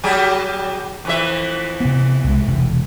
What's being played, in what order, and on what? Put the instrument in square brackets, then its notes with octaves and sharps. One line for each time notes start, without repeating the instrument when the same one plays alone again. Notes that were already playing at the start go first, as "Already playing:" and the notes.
[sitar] F#3 G3 G#4
F2 E3 E5
[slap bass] C3 B3
C2 G#3
E1 C3